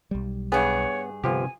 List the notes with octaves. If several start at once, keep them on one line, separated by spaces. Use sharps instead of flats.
B1 G3
G2 B3 G#4 C#5
G1 C3 F3 G4 G#5